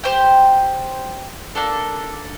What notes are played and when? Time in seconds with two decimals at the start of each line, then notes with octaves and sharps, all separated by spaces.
0.04 G4 C5 G5
1.55 A#3 D4 A4